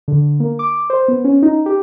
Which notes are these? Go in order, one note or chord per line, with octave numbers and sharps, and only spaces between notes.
D3
A#3
D6
C5
B3
C#4
D#4
G4